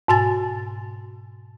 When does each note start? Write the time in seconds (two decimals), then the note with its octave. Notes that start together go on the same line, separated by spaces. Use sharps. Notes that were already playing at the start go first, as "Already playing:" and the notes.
0.08 G#2 B2 F#4 G#5 A6